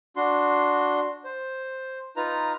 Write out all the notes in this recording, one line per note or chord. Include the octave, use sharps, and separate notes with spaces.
D4 F#4 C6
C5
D#4 F4 B4 A#5